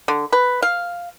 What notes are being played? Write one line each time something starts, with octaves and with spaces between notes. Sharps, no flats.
D3
B4
F5